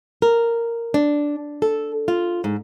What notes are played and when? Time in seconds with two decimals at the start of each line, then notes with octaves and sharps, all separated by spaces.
0.22 A#4
0.94 D4
1.62 A4
2.08 F4
2.44 G#2